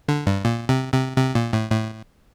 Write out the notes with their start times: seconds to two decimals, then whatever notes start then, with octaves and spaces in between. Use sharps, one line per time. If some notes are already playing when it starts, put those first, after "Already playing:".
0.08 D3
0.26 G2
0.45 A#2
0.69 C3
0.93 C3
1.17 C3
1.35 A#2
1.53 A2
1.71 A2